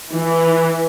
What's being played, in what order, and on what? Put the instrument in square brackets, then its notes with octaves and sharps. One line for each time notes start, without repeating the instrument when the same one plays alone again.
[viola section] E3